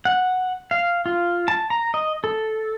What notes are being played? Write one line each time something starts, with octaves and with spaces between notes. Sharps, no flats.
F#5
F5
F4
A5
A#5
D#5
A4